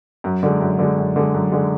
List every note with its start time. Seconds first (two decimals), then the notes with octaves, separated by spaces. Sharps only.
0.24 F#2
0.43 D3 G#3
0.61 F#2
0.79 D3 G#3
0.98 F#2
1.16 D3 G#3
1.34 F#2
1.52 D3 G#3